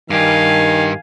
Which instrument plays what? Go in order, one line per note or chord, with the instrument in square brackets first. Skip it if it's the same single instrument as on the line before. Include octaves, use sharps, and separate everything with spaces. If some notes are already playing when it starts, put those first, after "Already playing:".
[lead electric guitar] G2 G4 [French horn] D#3 [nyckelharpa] F5 G#5